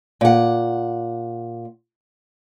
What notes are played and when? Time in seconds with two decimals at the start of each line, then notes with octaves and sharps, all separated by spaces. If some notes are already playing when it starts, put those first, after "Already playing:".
0.21 A#2 F#5